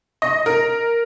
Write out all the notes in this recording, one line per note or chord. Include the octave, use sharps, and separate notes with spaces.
D#5
A#4